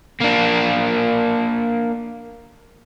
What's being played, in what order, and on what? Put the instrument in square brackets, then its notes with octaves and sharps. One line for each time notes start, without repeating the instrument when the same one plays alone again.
[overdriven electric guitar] A#3 D4